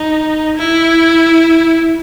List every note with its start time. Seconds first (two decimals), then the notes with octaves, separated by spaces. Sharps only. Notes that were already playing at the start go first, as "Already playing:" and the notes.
Already playing: D#4
0.57 E4